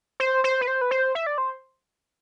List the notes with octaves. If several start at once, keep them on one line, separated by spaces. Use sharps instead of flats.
C5
C5
B4
C5
B4
C5
E5
D5
C5